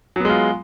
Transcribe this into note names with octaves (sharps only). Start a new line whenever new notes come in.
F#3 G#3 B3 F4